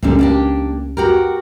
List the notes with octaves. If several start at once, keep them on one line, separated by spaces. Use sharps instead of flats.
C#2 A#2 D3 G3 C#4
A#3 D4 G4
F#4 G4 A#4